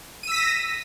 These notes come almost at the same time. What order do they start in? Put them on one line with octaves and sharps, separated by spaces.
D#7 E6 B6 A#6